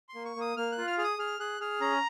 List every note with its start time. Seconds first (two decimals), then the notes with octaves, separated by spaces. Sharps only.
0.09 C6
0.15 A#3
0.25 C#6
0.36 A#3 D#6
0.57 A#3 F6
0.72 F#6
0.78 F4
0.87 F6
0.98 G#4 F6
1.04 D#6
1.18 G#4 F6
1.39 G#4 F#6
1.60 G#4 F6
1.81 C#4 A#5